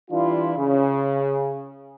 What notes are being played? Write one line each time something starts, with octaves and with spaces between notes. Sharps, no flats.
E3 G3 D4 E4 F4
C#3